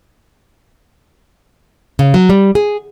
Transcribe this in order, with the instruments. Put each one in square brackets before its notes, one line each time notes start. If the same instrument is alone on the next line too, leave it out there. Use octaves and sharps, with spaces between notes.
[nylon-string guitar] C#3
F#3
G3
G#4